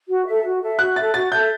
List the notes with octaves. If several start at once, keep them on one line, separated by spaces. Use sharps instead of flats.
F#4
A4 E5
F#4
A4 E5
F#4 F#6
A4 E5 A6
F#4 A6
A4 E5 G6